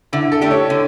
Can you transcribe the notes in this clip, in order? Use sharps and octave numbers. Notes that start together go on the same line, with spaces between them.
D3 E4
A4
A3 D4 G4
C#5
D3